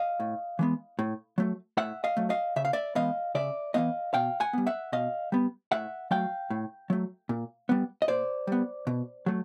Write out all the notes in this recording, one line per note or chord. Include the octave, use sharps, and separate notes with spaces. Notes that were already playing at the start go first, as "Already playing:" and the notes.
Already playing: D#5 F5
A2
E3 G#3 B3
A2
F#3 A3
A2 E5 F#5
D#5 F5
F#3 A3
D#5 F5
C#3 E5
F5
D5 E5
E3 G#3 B3 D#5 F5
C#3 D5 E5
E3 G#3 B3 D#5 F5
B2 F5 G5
F#5 G#5
G3 B3
E5 F#5
B2 D#5 F5
G3 B3
A2 E5 F#5
F#3 A3 F5 G5
A2
F#3 A3
A#2
G3 B3
D#5
A#2 C5 D5
G3 B3
B2
F#3 A3